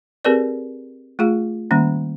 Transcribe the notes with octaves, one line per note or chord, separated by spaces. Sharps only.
C4 G4 G#4 A#4 B4 D5
A3 F4 G#4 F5
D#3 G3 A#3 C#4